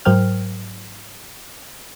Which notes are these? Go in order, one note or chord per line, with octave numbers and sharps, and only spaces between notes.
G#2 F#3 A#4 C5 G5 F6